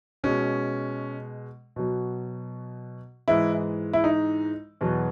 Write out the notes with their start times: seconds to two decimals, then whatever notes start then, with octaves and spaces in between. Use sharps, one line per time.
0.23 B2 G#3 C#4
1.76 B2 F#3
3.28 G#2 E3 G#3 E4
3.93 E4
4.04 D#4
4.81 E2 B2 F#3